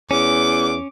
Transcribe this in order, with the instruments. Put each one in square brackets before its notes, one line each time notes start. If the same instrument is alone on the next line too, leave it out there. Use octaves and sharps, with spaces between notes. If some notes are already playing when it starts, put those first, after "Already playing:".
[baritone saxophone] E2 [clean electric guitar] C#4 [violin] D6